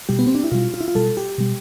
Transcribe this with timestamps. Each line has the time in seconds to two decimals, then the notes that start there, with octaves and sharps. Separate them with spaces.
0.09 B2 G3 G4
0.19 B3
0.27 C4
0.35 D4
0.44 E4
0.52 B2 G3 F4
0.74 F4
0.81 E4
0.88 F4
0.95 B2 G3 A4
1.17 G4
1.38 B2 G3